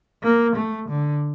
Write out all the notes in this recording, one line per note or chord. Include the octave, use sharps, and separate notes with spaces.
A#3
A3
D3